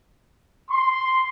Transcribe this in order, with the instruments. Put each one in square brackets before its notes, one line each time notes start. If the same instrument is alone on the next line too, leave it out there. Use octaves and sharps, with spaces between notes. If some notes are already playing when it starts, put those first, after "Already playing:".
[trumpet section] C6